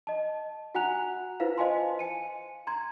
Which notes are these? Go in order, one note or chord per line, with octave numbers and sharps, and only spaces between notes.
D#5 A5
F#4 F#5 G#5 A#5 F#6 F7
E4 F4 B4 C5 F5
C5 D#5 F5 G#5 A5 C6
G#5 C#7 D#7
A#5 C6 G#6